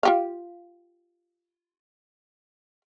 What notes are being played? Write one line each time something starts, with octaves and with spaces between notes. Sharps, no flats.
F4 G4 F5